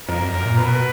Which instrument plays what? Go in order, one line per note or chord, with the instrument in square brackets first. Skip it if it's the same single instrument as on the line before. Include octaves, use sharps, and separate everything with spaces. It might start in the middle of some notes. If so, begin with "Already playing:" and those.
[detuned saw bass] F2 [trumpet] A#4
[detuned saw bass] F#2
F#2
A#2
[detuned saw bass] B2 [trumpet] B4